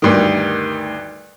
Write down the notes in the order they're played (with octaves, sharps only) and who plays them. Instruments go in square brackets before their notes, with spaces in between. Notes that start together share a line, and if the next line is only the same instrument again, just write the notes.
[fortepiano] D2 G2 D#3